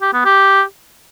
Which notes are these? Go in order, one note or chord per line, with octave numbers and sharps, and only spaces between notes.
G4
B3
G4